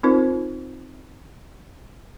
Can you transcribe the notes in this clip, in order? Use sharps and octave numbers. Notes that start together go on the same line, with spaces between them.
C4 D#4 F4 A#4 C5